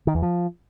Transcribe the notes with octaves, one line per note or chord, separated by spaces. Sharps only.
D#3
E2
F3